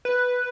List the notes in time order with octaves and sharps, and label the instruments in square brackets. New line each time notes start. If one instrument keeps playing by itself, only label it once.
[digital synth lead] B4